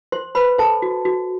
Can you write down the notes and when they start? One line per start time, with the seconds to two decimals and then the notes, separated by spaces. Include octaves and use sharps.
0.12 C5 C6
0.35 B4 C5 B5
0.58 A4 C5 A5
0.82 F#4
1.05 F#4